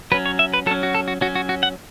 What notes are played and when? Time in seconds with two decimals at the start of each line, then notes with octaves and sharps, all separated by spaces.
0.12 F#3 B4
0.14 C#4
0.26 C#5
0.39 E5
0.54 B4
0.66 F#3 A4
0.71 C#4
0.83 F#4
0.95 A4
1.08 F#4
1.21 F#3 C#4 F#4
1.36 F#4
1.49 F#4
1.63 F#5